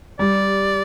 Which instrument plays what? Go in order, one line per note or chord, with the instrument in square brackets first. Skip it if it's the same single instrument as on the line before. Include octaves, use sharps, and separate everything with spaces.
[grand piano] G3 [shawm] D5